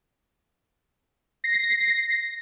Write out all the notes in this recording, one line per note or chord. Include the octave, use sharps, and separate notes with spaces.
A#6 C7